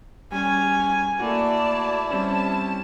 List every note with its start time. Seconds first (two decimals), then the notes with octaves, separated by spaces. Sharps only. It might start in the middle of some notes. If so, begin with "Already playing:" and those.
0.32 G3 C#4 G#5
1.20 A3 A#3 E4 F#4 D5 A5
2.11 G3 C4 C#4 A5